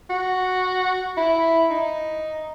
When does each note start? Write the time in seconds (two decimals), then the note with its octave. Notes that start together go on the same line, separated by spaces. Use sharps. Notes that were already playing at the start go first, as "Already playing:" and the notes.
0.10 F#4
1.17 E4
1.71 D#4